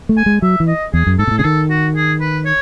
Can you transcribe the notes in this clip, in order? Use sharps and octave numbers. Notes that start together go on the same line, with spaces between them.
A3
G#5
G#3
F#3 E5
E3
D#5
E2 G#4
F#2
G#2 A4
B2
A2
C#3 G#4
D#3 A4
F#4
G#4
B4
C#5